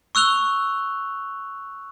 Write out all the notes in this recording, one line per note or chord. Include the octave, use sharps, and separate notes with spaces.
C#6 E6 F#6 F7 G7